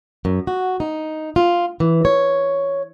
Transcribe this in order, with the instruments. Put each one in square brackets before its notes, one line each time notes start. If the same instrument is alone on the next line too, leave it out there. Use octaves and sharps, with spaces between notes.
[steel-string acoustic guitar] F#2
F#4
D#4
F4
E3
C#5